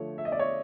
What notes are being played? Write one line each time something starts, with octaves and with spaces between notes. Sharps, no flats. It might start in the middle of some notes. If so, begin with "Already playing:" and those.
Already playing: D3 F3 A3 C#5
E5
D#5
D5
C#5